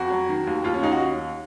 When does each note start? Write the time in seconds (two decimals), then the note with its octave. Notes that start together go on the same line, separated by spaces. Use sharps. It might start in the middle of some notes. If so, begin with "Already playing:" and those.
Already playing: F2 F#4
0.10 F#3
0.29 D#3
0.47 D#2
0.64 D#2 F4
0.74 C#4
0.83 D#2 D#4
0.92 F#4